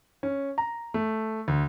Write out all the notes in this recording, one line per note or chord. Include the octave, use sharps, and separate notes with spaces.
C#4
A#5
A3
D2